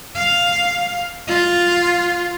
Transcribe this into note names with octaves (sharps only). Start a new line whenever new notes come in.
F5
F4